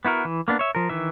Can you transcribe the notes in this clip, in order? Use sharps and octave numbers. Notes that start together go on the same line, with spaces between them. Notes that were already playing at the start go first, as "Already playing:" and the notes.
B3 E4 F#4 A#4
E3
A#3 B3 D4
C#5 E5
F3 A#4
D#3 E3 E5